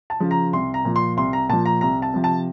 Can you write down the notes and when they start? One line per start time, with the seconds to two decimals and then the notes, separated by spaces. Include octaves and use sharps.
0.10 A5
0.20 C#3 F3
0.31 A#5
0.53 C2 C6
0.74 A#5
0.85 A#2 F3
0.96 C6
1.17 C2 C6
1.33 A#5
1.49 A#2 F3 A5
1.66 A#5
1.81 C2 A#5
2.02 A5
2.13 C3 F3
2.24 A5